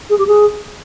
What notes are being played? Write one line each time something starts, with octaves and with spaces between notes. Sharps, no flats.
G#4
G4
G#4